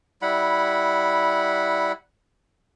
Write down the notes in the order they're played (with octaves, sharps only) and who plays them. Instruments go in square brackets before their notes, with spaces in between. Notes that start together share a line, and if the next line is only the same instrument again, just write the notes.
[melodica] G3 E4 F#5 B5